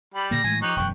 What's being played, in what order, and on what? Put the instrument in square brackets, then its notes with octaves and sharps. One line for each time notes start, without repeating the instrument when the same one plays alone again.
[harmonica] G3 [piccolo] B5
[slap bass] A#2 D3 A#3 [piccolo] A#6
[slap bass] A2 E3 G#3 [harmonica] G#5
[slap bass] F3 [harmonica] D#4 G4 C#5 [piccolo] F#6
[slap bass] E1 F#2 [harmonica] G5 C#6